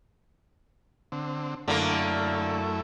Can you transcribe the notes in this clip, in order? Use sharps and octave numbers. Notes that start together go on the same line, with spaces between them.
D3 C4
F#2 D3 A3 A#3 E4